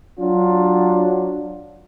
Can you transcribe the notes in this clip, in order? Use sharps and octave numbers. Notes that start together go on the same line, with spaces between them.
F#3 D4 F4